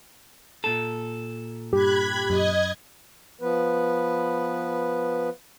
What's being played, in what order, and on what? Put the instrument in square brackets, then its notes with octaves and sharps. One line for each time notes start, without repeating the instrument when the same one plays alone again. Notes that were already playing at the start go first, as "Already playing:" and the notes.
[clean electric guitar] A#2 A4
[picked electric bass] G2 [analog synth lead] G4 [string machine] B5 F#6 G#6
[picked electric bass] F#2 [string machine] D#5 G#6
[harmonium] F3 B3 B4